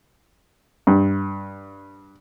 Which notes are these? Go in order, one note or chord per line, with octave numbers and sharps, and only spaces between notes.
G2